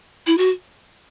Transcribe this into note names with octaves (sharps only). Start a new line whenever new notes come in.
E4
F#4